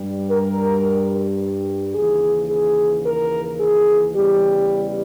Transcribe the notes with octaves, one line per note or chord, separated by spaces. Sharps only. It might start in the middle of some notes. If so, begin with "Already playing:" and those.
Already playing: G2 G3
A#4
D#2 C#3 E3 G#4
G#4
A#4
G#4
E2 C#3 E3 G3 G4